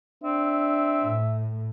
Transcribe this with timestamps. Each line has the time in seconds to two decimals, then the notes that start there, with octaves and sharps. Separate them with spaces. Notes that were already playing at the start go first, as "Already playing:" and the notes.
0.24 C4 D4 E5
1.04 A2